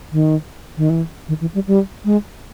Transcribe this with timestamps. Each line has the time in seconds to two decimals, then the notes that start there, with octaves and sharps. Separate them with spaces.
0.12 D#3
0.77 D#3
0.90 E3
1.28 D#3
1.41 E3
1.54 G3
1.67 G3
2.05 G#3